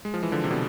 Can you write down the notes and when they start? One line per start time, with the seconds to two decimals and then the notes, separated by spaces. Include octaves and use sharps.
0.05 G#3
0.14 F3
0.23 E3
0.32 D3 F3
0.44 C3
0.50 B2 D3